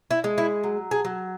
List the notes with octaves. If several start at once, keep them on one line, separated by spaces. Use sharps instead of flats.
E4
G#3
E4
F#3
G#4
F#3